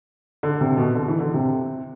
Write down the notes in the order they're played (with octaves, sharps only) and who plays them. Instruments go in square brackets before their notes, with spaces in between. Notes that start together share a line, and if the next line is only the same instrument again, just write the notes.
[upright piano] D3
C3
B2
D3
E3
D3
C3